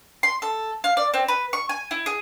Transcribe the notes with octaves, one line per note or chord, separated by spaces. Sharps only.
C6
A4
F5
D5
C4
B4
C#6
G#5
E4
G#4